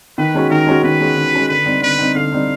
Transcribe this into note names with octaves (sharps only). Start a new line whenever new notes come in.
D#3 B4
G#3 C#4 F#4
D#3 A#4
G#3 C#4 F#4
D#3 B4
G#3 C#4 F#4
D#3
G#3 C#4 F#4
D3 B4
G3 C4 D#4
D3 B4
G3 C4 D#4
D3 F5
G3 C4 D#4